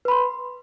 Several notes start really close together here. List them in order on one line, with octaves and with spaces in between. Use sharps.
B4 B5 C6